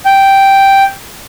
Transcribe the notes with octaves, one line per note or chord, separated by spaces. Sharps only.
G5